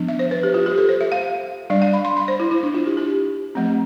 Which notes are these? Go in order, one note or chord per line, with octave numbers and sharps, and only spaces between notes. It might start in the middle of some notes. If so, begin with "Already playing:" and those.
Already playing: F3 B3 D4
E5
C5
B4
G4
F4
G4
A4
C5
E5
F5
G3 D4 D5
F5
B5
C6
B5
C5
E4
E4
D4
F4
G4
G4
F3 A3 C4